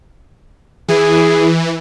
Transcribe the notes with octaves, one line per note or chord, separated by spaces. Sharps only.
E3 E4 G#4